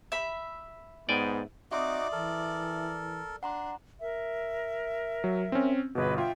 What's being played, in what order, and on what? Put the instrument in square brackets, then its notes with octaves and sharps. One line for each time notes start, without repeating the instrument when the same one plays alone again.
[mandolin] E5 B5
[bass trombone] G#2 [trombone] B3 [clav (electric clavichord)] D5 G5 G#5
[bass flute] C4 [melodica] D#4 F#4 D6 [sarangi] D5 [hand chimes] E5 C6 D#6
[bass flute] E3 [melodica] A4 A#4
[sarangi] D4 [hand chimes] F#5 A#5 C6
[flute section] A#4 E5
[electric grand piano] F#3
C4 C#4
[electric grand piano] G1 B2 [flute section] G#4 B4 D#5
[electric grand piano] F4 [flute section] E5 G5